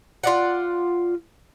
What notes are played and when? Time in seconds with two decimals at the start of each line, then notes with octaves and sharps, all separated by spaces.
0.23 F4 D5 F#5